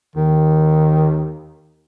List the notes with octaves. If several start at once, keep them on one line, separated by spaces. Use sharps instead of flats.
D#2 D#3